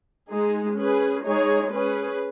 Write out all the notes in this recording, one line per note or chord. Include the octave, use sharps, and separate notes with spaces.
G#3 D#4 G#4
C#4 G#4 B4
G#3 D#4 G#4 C#5
C#4 G#4 B4